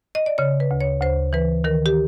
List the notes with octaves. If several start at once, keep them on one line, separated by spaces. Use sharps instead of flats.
D#5
D5
C#3 C#5
B4
D2
C#5
D2 C5
E3 B4
D#3 A#4
G4